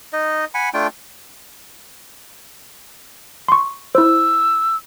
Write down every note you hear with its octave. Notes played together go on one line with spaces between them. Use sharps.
D#4 D#5
F#5 G#5 B5
A3 D4 F4 G5
C6 C#6
E4 C5 E6